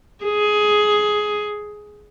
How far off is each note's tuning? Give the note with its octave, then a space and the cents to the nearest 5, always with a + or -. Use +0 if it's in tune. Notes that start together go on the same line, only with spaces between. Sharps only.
G#4 +10